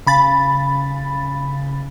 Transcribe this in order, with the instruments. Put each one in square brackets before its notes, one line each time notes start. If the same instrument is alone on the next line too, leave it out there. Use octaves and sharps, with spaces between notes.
[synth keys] C#3 B5 A6